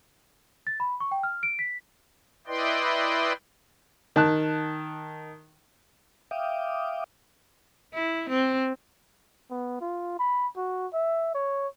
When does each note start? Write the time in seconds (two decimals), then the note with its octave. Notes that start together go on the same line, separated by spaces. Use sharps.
0.67 A6
0.80 B5
1.00 C#6
1.11 G5
1.23 F6
1.43 D7
1.59 B6
2.47 E4 B4 D5 D#5 G5 C6
4.16 D#3 A5 F#6
6.31 E5 F5 G5 D6 D#6
7.94 E4
8.29 C4
9.51 B3
9.81 F4
10.19 B5
10.57 F#4
10.93 E5
11.35 C#5